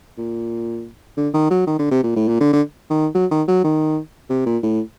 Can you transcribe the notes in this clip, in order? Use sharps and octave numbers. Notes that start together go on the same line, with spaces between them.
A#2
D3
D#3
F#3
D#3
D3
C3
A#2
A2
A#2
D3
D3
D#3
F#3
D#3
F#3
D#3
C3
A#2
A2